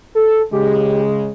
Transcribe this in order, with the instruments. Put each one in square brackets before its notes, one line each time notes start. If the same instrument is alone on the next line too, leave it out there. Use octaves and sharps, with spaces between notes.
[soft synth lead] A4
[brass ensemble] C#3 G#3 [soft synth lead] G4